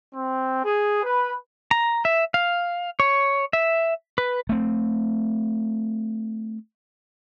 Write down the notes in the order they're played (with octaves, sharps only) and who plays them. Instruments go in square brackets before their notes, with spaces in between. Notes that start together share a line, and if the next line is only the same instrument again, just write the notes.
[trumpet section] C4
G#4
B4
[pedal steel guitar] A#5
E5
F5
C#5
E5
B4
[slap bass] A3 C4